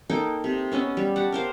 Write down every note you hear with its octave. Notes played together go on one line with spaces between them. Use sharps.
A#3 D#4 A4 G5
C3
B3 C#4 D#5 E5
G3
G4 F#5 A5
A#4 C5 F5